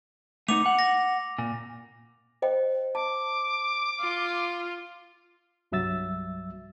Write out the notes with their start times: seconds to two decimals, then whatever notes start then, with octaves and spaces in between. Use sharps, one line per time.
0.48 A3 B3 D#4 D6 F7
0.66 F#5
0.79 A#6
1.38 A#2
2.42 C5 D#5 G5
2.95 A5 D6
4.01 F4
5.72 C2 G2 F#3 E5 E6 A6